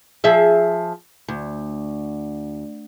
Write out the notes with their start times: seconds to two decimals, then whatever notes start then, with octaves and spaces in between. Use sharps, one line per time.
0.24 F3 G#4 E5
1.28 D2